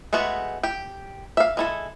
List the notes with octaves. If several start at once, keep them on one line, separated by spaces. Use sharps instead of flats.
G#3 A3 B3 F#4
G4 G5
E5 F5
G#3 E4 A4